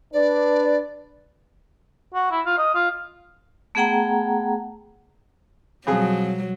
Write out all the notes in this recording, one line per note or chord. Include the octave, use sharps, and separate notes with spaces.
D4 B4 D5
F#4
E4
F4
D#5
F4
A3 B3 G#4 F#5 G5 A#5
F2 B2 F#3 G3 G#4